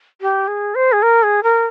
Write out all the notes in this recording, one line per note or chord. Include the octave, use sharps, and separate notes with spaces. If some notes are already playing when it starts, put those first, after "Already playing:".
G4
G#4
C5
G#4
A#4
G#4
A#4